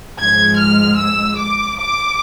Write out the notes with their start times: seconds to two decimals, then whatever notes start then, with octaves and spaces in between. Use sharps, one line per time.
0.18 G#2 F3 G#3 G#6
0.59 F6
0.99 E6
1.37 D6
1.78 D6